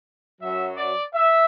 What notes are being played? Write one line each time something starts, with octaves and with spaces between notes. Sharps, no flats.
F#2 F#3 E5
D5
E5